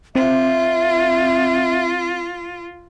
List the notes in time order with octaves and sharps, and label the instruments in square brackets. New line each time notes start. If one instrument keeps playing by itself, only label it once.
[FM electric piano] C4 [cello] F4 [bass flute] E5